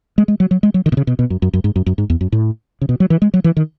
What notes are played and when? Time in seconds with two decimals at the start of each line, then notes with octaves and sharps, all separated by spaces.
0.18 G#3
0.28 G#3
0.40 F#3
0.51 F#3
0.63 G#3
0.74 F#3
0.86 D#3
0.92 B2
0.97 C#3
1.07 B2
1.19 B2
1.30 F#2
1.42 F#2
1.53 F#2
1.64 G#2
1.76 F#2
1.86 F#2
1.98 G#2
2.10 E2
2.21 F#2
2.32 A2
2.81 C#3
2.89 B2
3.00 F#3
3.10 E3
3.22 G#3
3.34 F#3
3.44 E3
3.57 D#3